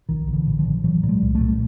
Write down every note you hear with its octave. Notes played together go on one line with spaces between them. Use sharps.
A#1 D#3
A#1
D3 E3
A#2
D#3 F3
A#1
A#2 E3 F#3
A#2
F#3 G#3
C2
G3 A3
A#2